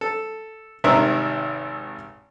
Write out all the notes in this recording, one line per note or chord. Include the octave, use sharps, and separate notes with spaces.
A4
G#1 C3 D#3 D4 A#4 E5